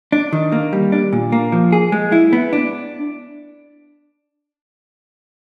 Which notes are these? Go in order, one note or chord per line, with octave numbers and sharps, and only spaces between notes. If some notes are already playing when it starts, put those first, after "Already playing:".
D4
D#3
A#3
G3
D4
A#2
A#3
F3
G#4
G#3
E4
B3
D4